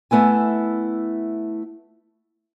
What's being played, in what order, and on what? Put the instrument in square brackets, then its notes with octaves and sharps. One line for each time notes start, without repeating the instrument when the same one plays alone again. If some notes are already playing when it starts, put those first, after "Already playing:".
[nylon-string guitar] A3 B3 E4 G#5